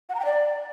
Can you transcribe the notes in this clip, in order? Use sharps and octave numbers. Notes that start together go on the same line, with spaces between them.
F#5
A#5
G5
D5